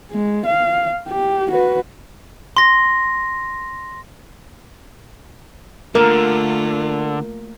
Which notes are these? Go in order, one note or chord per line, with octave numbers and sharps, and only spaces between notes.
G#3
F5
G4
F#4 B4
C6 A#6
D3 A3 A#3 F4 A#4